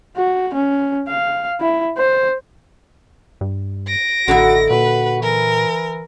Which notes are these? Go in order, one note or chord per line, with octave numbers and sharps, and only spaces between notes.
F#4
C#4
F5
E4
C5
G2
A#6 D7
A1 D3 D#4 E4 F#4
A#2 F#4 B4
E3 A#4